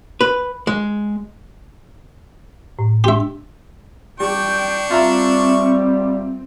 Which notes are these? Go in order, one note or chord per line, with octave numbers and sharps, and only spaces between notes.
B4
G#3
A2
D4 G4 E5 C6
G3 D4 G5 C#6
G3 C4 F4 E5 A#5